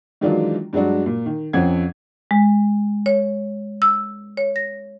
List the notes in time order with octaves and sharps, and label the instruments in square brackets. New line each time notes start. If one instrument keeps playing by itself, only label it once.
[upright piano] D#3 E3 F#3 G#3 D4 F4
G2 F#3 G#3 D4 F#4
A#2
D#3
F2 F3 C4 C#4 F#5 G#6
[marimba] G#3
C#5
E6
C#5
A#6